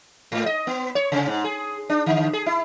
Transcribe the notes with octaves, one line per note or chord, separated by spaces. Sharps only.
G#2
D#5
B3
C#5
C3
G#2
G#4
D4
D3
G#4
E4